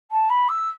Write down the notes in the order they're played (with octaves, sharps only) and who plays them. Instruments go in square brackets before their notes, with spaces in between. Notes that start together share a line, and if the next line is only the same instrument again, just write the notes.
[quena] A5
B5
E6